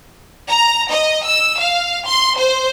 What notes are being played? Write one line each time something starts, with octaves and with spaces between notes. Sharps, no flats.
A#5
D#5
E6
F5
C6
C5